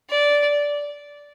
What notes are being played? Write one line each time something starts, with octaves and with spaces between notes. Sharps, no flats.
D5